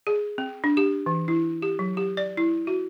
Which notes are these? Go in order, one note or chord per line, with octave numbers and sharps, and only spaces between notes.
G#4
C4
D4
G4
E3
E4
G4
F#3
G4
D5
E4
F#4